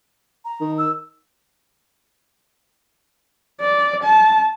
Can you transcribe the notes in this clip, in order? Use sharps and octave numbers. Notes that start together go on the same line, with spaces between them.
A#5
D#3
E6
D5
A5